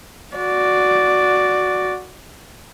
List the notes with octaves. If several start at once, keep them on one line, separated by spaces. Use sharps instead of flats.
F#4 D5